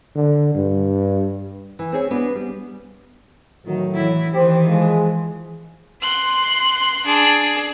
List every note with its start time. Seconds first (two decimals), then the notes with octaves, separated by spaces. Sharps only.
0.15 D3
0.55 G2
1.79 E3
1.92 C4 G#4 C#5
2.11 B3 D4 F#4 B4
2.35 G3
3.66 A2 D#3 F#3
3.95 E3 E4
4.33 D#3 E3 G4 C5
4.68 F3 G#3
6.01 C6 F#6
7.05 D4 G#4